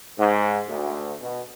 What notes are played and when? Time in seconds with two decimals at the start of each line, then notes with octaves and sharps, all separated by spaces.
0.19 G#2
0.68 D2
1.20 B2